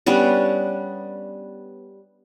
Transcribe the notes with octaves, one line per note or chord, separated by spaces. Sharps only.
G3 B3 C#4 D4